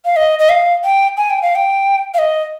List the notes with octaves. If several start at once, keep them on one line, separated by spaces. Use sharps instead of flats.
F5
D#5
D#5
F5
G5
G#5
G5
F5
G5
F5
D#5